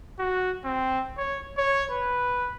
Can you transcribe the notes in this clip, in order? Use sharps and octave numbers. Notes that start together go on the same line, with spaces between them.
F#4
C4
C#5
C#5
B4